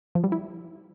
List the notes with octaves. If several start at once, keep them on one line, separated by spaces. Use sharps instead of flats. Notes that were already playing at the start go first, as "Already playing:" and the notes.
F3
G3
E4